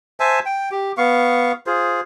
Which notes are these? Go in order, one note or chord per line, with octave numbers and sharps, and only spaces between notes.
C5 E5 G#5 A5
G5
G4
B3 F5 C#6
F4 G#4 C5